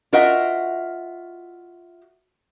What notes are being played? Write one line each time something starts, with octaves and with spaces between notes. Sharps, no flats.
F4 F#4 A#4 D#5 E5 F#5